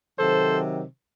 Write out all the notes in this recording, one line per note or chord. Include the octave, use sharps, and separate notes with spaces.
C3 D#3 F#3 A4 C5